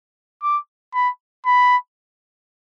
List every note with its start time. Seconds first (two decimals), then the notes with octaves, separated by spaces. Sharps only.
0.43 D6
0.94 B5
1.46 B5